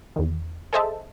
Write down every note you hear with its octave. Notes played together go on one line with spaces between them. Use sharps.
E2 D#3
G#4 A4 C5 D#5 E5 A5